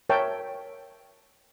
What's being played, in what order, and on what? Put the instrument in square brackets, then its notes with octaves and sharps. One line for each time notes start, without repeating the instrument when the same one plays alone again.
[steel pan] A#4 C#5 E5 G5 A5